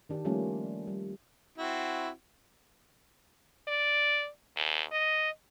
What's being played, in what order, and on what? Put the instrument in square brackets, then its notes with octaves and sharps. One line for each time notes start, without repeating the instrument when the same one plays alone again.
[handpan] D#3 D4 G4
F3 G3 A3 A#3 C#4 F4
G3
[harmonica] C4 E4 F#4
[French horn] D5
D#2
D#5